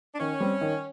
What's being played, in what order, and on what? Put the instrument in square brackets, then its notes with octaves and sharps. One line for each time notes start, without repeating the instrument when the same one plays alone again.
[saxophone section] D4
[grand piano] D#3 [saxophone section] C#4
[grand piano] G3 C4
D#3